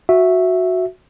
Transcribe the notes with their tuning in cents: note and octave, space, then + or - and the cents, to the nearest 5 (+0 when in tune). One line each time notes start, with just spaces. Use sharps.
F#4 -10 E5 +0